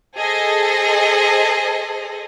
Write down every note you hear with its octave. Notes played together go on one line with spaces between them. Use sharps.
G#4 A4 C5 D#5